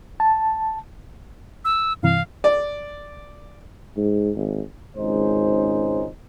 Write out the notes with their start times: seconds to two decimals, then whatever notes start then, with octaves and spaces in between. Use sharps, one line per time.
0.20 A5
1.65 E6
2.03 G2 C3 E3 F5
2.44 D5
3.97 G#2
4.36 G#1
4.97 G#1 C#2 G#2 C#4 D#4 C5